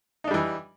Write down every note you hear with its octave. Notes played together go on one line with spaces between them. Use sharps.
E3 G3 D4 D#4